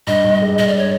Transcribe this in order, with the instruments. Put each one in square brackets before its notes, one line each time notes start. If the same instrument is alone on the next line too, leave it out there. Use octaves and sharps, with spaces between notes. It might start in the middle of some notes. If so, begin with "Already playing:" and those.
[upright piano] G2 [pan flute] D#5
[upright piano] G2
G#3
[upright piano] G2 [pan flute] D#5
[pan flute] D5
C#5